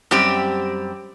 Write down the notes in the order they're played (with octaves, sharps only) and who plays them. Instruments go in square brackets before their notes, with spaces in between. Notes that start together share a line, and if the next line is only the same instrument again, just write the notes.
[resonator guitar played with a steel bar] F#2 G3 C4 G4